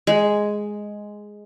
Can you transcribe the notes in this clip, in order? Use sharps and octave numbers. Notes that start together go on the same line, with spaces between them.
G#3